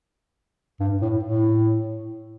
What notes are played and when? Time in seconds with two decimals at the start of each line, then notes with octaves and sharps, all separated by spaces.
0.80 G2
1.01 A2
1.23 A2